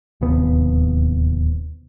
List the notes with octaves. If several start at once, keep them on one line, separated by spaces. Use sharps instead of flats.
D1 D#2 C3 B3